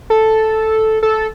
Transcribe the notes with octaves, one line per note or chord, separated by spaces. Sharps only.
A4
A4